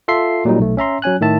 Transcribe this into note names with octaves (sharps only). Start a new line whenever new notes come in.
F4 A4 E5 C6 C7
A#2 F#3 G3 D#4
B1 A3
C#4 E5 A#5 C6
F#3 C#4 G#5 F#6
A2 D#3 E5 A5